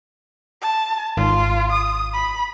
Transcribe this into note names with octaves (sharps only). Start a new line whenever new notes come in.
A5
G#1 F4
D#6
B5